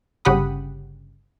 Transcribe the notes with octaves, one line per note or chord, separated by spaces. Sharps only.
G1 C#3 G4 F#5 B5 D#6